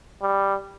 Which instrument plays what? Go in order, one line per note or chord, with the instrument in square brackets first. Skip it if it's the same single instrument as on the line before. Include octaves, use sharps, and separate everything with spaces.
[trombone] G3